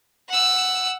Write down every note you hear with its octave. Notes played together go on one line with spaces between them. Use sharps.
F#5 E6